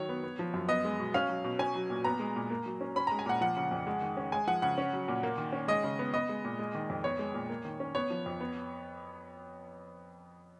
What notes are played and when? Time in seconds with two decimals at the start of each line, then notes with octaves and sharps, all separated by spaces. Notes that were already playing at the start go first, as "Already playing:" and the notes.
Already playing: D#3 F#3 C#5
0.09 B3
0.23 B3
0.39 F3
0.54 F#2
0.68 B3 D#5
0.85 G#3
0.99 B2
1.14 C#4 F5
1.29 F#3
1.44 B2
1.59 C#4 G#5
1.75 F#3
1.90 A#2
2.04 B3 A#5
2.20 G#3
2.36 A#2
2.50 A#3
2.66 F#3
2.81 C#4
2.96 C#4 B5
3.07 A#5
3.12 G#3
3.19 G#5
3.26 A#2 F#5
3.41 F3 F#5
3.57 C#3
3.71 F2
3.87 G#3
4.02 D#3
4.17 C#4
4.32 G#3 G#5
4.47 F3 F#5
4.62 C#3 F#5
4.78 C#4
4.93 F#3
5.08 A#2
5.23 A#3
5.37 D#3
5.53 C#4
5.68 G#3 D#5
5.84 C#3
5.99 B3
6.14 B3 D#5
6.29 G#3
6.45 A#2
6.59 G#3
6.75 D#3
6.90 F2
7.04 B3 C#5
7.19 G#3
7.34 A#2
7.49 A#3
7.65 D#3
7.80 C#4
7.95 B3 C#5
8.10 F3
8.26 F2
8.41 B3